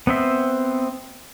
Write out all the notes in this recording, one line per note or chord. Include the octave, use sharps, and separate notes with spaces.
B3 C4 E5